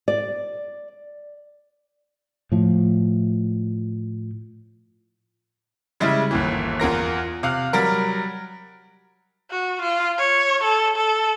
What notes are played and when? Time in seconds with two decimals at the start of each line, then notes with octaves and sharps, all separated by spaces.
0.08 D5
2.52 A2 F3
6.00 C#3 G3 G#3 E4
6.31 G1 D#2 E3
6.80 E2 F4 A#4 A#6
7.43 C3 F5 F6 F#6
7.73 F#3 G3 A#4
9.50 F#4
9.82 F4
10.19 C#5
10.64 A4
10.96 A4